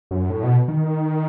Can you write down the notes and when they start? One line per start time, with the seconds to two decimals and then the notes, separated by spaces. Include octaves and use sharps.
0.11 F#2
0.30 A2
0.43 B2
0.68 D#3